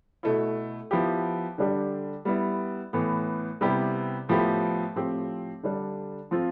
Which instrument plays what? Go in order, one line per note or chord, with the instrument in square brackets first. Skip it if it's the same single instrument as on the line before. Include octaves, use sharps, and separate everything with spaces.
[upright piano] B2 A3 E4
F3 B3 E4 G4
D3 G3 D4 G4
G3 B3 E4
A2 E3 B3
C3 G3 B3 E4 G4
A2 F3 B3 E4 G4
A2 F3 C4 G4
D3 G3 D4
F3 C4 F4